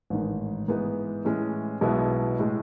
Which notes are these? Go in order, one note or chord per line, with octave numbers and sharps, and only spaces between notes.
A1 G#2 D#3
G#2 E3 G#3 B3
A2 E3 G#3 C#4
B1 B2 G#3 B3 E4
A2 G#3